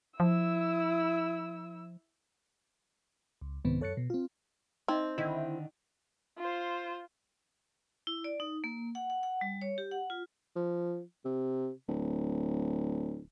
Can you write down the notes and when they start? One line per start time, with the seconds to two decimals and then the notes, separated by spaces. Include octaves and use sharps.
0.20 F3 E4 E6
3.41 C#2
3.64 C2 G#2 C3 D#3 B3 C4
3.80 F#2 A4 C#5 F#6 A6 C#7
3.97 B2
4.10 C4 F4
4.88 C4 D#4 D#5 E5
5.18 D3 D#3 E4
6.38 F4 C5
8.07 E4
8.24 D5
8.40 D#4
8.64 A#3
8.95 F#5
9.10 F#5
9.23 F#5
9.41 G3
9.62 C#5
9.78 G4
9.91 F#5
10.10 F4
10.56 F3
11.25 C3
11.88 D1